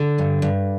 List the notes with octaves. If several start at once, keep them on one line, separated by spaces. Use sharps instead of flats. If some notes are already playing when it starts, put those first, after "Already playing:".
Already playing: D3
G2
G2